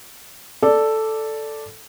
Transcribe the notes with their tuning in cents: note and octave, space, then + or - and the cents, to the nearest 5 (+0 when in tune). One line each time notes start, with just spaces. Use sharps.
A4 +0 D5 +0